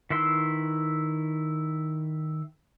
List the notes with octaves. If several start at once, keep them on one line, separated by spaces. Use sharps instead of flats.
D#3 E4 B4 C6 E6